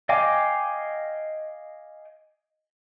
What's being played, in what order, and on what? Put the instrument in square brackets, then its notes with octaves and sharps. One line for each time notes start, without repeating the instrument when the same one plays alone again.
[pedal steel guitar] D#5 F5 G5 G#5 D6